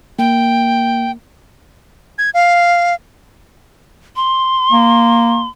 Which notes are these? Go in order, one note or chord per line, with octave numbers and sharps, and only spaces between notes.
A#3 G5
G#6
F5
C6
A#3